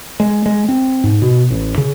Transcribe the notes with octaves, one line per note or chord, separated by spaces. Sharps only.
G#3
G#3
C4
G#2
B2
A1
C#3